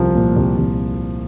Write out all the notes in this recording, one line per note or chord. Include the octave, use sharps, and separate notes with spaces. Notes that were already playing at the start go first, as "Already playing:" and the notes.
Already playing: C2 F3
A#2
C2
C2